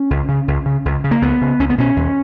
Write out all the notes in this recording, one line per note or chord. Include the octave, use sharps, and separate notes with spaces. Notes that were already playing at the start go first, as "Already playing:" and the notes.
Already playing: C#4
C#2
C#3
C#2
C#3
C#2
C#3
A#3
C#2 B3
C#3
C#2 C#4
B3
B2 C#4
D#2